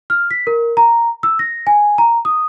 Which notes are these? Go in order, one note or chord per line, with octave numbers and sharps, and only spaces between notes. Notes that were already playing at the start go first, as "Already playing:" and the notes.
F6
B6
A#4
A#5
E6
A#6
G#5
A#5
D#6